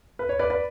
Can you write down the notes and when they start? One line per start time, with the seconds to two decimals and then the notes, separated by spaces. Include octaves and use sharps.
0.19 B4
0.29 C#5
0.39 B4 D5
0.50 B4 D5